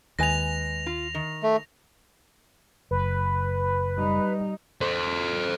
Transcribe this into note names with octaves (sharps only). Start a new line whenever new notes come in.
D#2 G#3 B4 G#5 A#6 F7
F4
D#3
A3
F#1 B4
G3 D#4
A4 C5